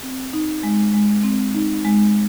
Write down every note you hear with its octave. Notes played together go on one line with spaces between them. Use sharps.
C4
D#4
G#3
G#3
C4
D#4
G#3